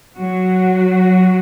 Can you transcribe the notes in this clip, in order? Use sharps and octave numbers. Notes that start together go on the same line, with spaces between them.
F#3 F#4